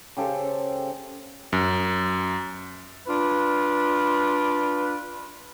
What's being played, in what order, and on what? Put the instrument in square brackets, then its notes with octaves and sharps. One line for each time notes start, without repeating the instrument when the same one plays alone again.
[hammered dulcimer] C#3 G4 A4 C5
[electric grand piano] F#2
[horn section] D4 F4 B4